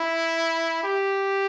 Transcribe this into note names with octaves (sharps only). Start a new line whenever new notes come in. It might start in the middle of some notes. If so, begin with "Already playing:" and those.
Already playing: E4
G4